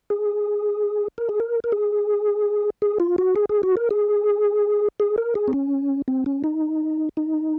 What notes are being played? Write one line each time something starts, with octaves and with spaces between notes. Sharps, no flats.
G#4
A#4
G#4
A#4
A#4
G#4
G#4
F4
F#4
G#4
G#4
F#4
A#4
G#4
G#4
A#4
G#4
C4
C#4
C4
C#4
D#4
D#4